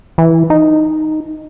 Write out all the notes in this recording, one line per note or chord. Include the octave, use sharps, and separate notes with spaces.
E3
D#4